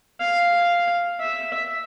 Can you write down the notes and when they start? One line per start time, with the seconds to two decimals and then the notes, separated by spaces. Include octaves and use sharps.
0.20 F5
1.20 E5